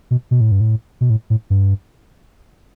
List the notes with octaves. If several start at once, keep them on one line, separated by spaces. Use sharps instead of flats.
B2
B2
A2
G2
A2
B2
A2
A2
G2